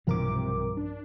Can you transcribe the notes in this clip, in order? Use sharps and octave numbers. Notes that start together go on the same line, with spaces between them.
B1 G2 C3 E3 F3 A#4 D6
D4